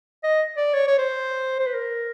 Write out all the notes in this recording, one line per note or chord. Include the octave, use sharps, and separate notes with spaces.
D#5
D5
C#5
C#5
C5
C5
B4
A#4